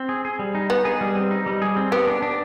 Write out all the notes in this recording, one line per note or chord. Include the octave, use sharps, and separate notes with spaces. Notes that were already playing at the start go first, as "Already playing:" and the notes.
Already playing: C4
G#4
G#4
G3
D#4
B3 D#4
G#4
G3
C4
D#4
G3
G#4
C4
B3 G4
D4
D4